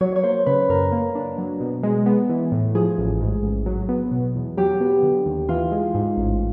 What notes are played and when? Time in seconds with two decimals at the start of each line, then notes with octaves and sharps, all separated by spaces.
0.01 F#3 C#5
0.16 C#5
0.23 A#3 C5
0.46 C#3 B4
0.69 F#2 A#4
0.92 A#3
1.15 D4
1.38 F#3
1.60 B2
1.83 G#3
2.06 B3
2.29 E3
2.52 A2
2.75 F3 G#4
2.98 A1
3.20 G#2
3.43 A1
3.66 F#3
3.89 B3
4.12 B2
4.35 E2
4.57 F#3 G4
4.80 B3
5.03 D3
5.26 D#2
5.49 E3 F4
5.72 G#3
5.94 G#2
6.17 A1